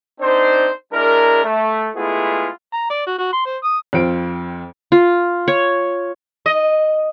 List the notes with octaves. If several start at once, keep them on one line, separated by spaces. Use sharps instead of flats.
C4 D4 D#4 C5
G#3 D4 E4 A#4
A3
G#3 A3 B3 E4 F4 G#4
A#5
D5
F#4
F#4
C6
C5
D#6
F2 C4 F4 D7
F4
C#5
D#5